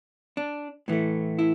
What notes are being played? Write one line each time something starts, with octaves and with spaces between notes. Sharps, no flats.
D4
A2 E3 A3
E4